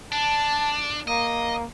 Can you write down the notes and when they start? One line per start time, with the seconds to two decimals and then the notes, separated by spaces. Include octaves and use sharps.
0.12 D4 A5
1.08 A#3 D#5